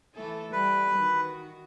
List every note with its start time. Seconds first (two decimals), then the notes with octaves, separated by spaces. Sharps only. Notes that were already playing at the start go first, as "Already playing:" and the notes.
0.15 E3 A3 A4
0.52 G3 B4
0.95 D#3 F#4